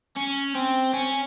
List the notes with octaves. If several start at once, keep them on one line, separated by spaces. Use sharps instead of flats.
C#4
C4
C#4